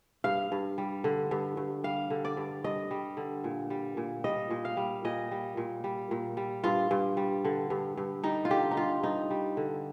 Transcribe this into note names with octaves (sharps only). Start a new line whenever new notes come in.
G2 F5
G2
G3
D3
G2
G2
G3 F5
D3
D5
G2
G2 D#5
G3
D3
A#2
G3
A#2
G3 D#5
A#2
F5
G3
A#2 D#5
G3
A#2
G3
A#2
G3
G2 F4
G2
G3
D3
G2
G2
G3 D#4
F4
D3 G4
D#4
G2 F4
G2 D#4
G3
D3